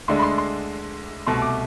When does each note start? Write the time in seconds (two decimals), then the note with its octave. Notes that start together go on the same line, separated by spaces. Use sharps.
0.08 D2 D3 G#3 D4 C6
0.19 B5
0.22 C6
0.38 C6
1.27 C2 B2 A3 C6
1.42 D6